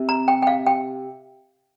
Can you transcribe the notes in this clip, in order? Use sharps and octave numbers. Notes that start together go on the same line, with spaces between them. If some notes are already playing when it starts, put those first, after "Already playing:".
Already playing: C3
A#5
G5
G5
F5
G5